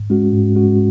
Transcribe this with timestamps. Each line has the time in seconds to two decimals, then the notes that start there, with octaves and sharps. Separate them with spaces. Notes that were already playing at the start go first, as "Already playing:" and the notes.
Already playing: G#2
0.10 G#3 C#4 F#4
0.33 G#2
0.56 G#3 C#4 F#4